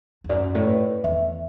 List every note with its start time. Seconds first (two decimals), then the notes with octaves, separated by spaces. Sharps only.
0.24 E2
0.29 F#2 D5
0.55 A2
0.67 B4
1.04 E2 E5